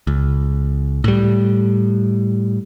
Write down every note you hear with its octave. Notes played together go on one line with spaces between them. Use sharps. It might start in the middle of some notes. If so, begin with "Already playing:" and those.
C#2
A2 G3